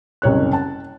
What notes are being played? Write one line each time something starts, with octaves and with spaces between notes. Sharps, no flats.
F#1 C2 C#5 F#6
A5